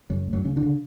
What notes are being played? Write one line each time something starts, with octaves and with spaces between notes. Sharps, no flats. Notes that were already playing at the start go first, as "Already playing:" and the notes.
F#2 C#3 F#3
D2
F#2 F#3
C#3 C#4
D3 D4
C#3